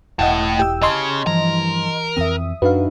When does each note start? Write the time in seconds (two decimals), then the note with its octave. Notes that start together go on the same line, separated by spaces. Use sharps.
0.19 E1 A2 E4 D#5 F#5 G5 D#6
0.59 G4 G5 E6
0.82 C#3 D#5 A5 C6 F6 G#6
1.27 G2 E3 F3 A#4
2.17 F2 E3 C4 E5 D#6
2.62 F#2 D4 D#4 F#4 B4 F5